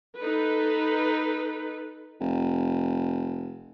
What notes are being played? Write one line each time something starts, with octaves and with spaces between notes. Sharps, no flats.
D#4 A4 B4
F1